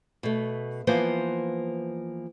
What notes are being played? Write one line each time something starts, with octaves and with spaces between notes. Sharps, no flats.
B2 A3
E3 F3 A#3 B3 C5